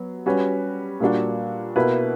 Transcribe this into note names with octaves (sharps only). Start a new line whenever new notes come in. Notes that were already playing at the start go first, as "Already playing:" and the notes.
Already playing: F#3 B3
G3 C#4 F#4 B4
A#2 G3 A#3 D4 F#4
B2 A#3 E4 B4